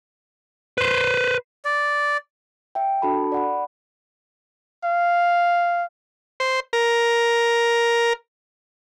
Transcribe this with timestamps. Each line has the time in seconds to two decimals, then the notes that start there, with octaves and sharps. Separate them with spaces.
0.78 B4 C5
1.65 D5
2.75 E5 G5
3.02 D4 F#4 A4 A5 B5
3.32 D5 F#5 B5
4.84 F5
6.40 C5
6.73 A#4